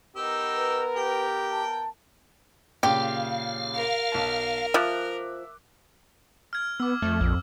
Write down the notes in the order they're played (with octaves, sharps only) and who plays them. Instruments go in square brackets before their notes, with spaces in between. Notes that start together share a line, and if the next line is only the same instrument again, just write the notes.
[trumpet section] B3 A#4 [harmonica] D#4 G4 E6
[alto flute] B4
[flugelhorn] G4 [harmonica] G5
[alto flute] A5
[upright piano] A#2 C#3 [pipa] G4 [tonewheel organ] F5
[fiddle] A#4
[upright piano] B1 A5
[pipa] F3 [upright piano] E5 D6 F#6
[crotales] F6 G#6
[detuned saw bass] B3 [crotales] D6 E6
[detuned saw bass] F2 [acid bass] A3
[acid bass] A#1